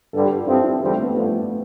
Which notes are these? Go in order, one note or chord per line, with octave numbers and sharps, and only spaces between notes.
G2 D3 G3 A4
G4
F4
G2 F3 C4 E4
E4
E2 D3 G3 C4
A3
B3
G2 D3 F3 A3